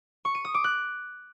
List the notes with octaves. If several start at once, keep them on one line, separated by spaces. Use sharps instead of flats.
C#6
D#7
D#6
D6
F#6